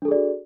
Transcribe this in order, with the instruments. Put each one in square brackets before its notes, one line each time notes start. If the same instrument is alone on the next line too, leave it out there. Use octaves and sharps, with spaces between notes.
[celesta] D4
A4
G#4
D5
F#4